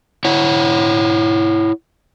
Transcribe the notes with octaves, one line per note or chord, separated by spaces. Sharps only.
E4 C#5 F#5